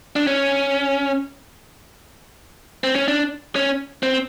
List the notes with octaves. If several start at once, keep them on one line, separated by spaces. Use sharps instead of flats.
D4
C#4
C4
C#4
D4
C#4
C4